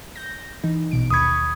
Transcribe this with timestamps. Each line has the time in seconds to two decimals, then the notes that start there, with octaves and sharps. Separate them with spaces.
0.15 G6 A#6
0.63 E3 D#4
0.91 A#1 B2 D7
1.11 D#2 B5 C#6 D#6 G#6